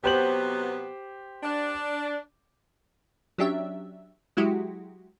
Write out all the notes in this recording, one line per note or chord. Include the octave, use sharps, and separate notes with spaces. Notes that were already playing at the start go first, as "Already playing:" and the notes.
C3 F#3 B3 G4 C5 F#7
D4
F#3 C#4 D4 G4 E5
F#3 G#3 E4 F#4 G4